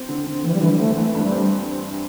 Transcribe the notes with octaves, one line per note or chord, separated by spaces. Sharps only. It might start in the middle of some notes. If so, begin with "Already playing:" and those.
Already playing: C4
D3
D3
E3 C4
G3
D3 E3
G3
A3 C4
E3 A3
G2 A3
G3
C4